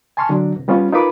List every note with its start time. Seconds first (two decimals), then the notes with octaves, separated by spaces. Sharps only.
0.17 G#5 A5 C6 C#6 F6
0.29 D3 F#3 D4
0.56 C2
0.68 G3 B3 C#4 F4
0.92 D#4 F4 A#4 B4 B5 D6